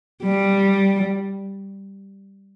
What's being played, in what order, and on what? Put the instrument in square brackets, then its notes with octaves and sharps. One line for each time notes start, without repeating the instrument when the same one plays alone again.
[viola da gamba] G3